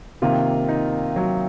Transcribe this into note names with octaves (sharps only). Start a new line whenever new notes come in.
C3 D#3 A#3 F4
D#4
F#3